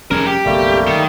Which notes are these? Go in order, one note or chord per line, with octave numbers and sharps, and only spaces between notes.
F1 G3 C#4 G#4 A#4
G4
F#1 B1 F#2 G3 A3 A#3
D#3